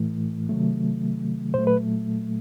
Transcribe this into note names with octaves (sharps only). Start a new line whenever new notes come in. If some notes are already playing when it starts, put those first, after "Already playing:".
Already playing: A2 E3 A3
C3 D#3 F#3 A3
A#2 F#3 A3 C5
B4